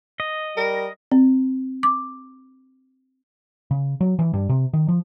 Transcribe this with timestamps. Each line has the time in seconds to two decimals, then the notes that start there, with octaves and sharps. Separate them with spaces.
0.20 D#5
0.57 G3 A#4
1.11 C4
1.83 D6
3.71 C#3
4.01 F#3
4.19 E3
4.33 G2
4.49 C3
4.73 D#3
4.88 F3